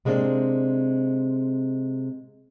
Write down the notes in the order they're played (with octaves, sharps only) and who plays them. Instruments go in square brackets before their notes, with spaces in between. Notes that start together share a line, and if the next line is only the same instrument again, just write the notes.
[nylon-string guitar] C3 G#3 A#3 C4 D4